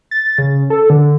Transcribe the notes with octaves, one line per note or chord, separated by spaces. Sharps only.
A6
C#3
A4
D3